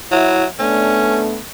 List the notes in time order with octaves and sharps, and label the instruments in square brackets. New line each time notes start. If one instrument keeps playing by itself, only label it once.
[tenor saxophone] F#3 [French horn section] E4
[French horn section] A3 B3 D4 [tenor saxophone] C#4